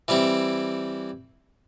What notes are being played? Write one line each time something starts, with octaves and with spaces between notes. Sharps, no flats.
E3 G3 C4 E4